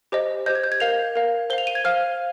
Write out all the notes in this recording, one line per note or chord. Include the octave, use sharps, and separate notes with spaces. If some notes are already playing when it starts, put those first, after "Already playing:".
G4 C5 D#5
G4 C5 D#5 G6
G#6
G6
G#6
A#4 F5 F7
A#4 F5
C5 F5 F7 G7
D#7
G#6
C5 F5 F6